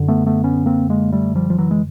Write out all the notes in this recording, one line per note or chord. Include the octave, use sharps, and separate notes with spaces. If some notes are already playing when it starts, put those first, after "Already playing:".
Already playing: F#2 D3
A3 B3
A3 B3
B3 C#4
A#3 C4
G#3 A#3
G3 A3
F3 G3
F3
E3 F#3
G#3